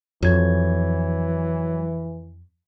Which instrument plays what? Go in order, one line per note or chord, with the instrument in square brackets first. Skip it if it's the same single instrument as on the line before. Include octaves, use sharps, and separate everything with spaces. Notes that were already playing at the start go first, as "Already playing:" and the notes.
[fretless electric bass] F2 [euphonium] E3 [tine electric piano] F#3 G#6